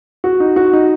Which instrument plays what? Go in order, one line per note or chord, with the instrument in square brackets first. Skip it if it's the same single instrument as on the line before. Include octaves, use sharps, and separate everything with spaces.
[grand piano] F#4
D#4
F#4
D#4